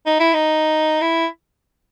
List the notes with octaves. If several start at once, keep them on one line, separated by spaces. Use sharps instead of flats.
D#4
E4
D#4
E4